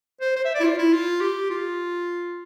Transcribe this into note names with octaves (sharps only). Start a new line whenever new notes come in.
C5
C5
E5
D5
E4
F4
E4
F4
G4
F4